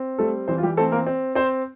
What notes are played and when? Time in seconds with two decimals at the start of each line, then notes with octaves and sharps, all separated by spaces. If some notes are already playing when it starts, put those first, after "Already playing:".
Already playing: C4
0.18 G3 A3 A4
0.48 E3 C4 C5
0.58 F4
0.63 G3 G4
0.77 A3 C4 A4
0.92 A#3 A#4
1.07 C4
1.35 C4 C5